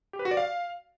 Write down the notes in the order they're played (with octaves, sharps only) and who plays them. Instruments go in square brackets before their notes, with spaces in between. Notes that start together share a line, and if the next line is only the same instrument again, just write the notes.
[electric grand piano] G4
B4
F#4
D5
F5